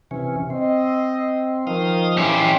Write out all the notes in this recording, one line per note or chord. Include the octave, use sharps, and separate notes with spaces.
C3 E3 C#4
C4 D#5
D#3 F3 F5 D#6
C#4 E4 G4 E5